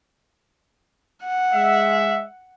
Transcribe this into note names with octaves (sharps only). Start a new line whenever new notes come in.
F#5
G#3 E5